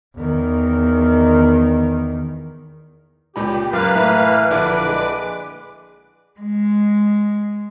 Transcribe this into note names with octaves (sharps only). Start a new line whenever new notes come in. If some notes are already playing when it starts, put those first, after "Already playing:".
E2 D#3
C#2 A#2 G4 B5
F#2 A#3 B4 F5
A2 E3
A#1 D3 E4 B4 D6
G#3
G#3